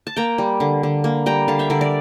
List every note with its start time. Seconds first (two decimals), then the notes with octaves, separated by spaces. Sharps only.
0.07 A5
0.16 A#3 G5 A#5
0.38 G3
0.60 D3
0.83 D3
1.04 A#3
1.26 G3 G5 A#5
1.48 D3 F5 A5
1.59 E5 G5
1.70 D3 A#4 D5
1.81 A#4 D5